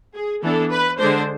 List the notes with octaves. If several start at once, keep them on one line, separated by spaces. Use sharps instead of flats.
G#4
E3 B3 D4 A4
B4
D3 G#3 D4 C5